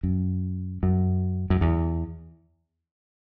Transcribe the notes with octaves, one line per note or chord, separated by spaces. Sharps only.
F#2
F#2
F#2
E2